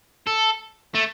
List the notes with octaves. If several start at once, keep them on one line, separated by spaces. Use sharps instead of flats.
A4
A3